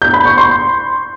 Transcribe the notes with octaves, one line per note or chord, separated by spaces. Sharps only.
G6
B5
C#6
C6